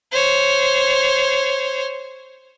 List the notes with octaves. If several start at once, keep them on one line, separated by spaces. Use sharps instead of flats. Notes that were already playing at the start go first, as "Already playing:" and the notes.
C5 C#5